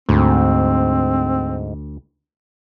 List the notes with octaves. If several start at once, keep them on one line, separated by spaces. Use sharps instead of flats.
D2 G#2 C4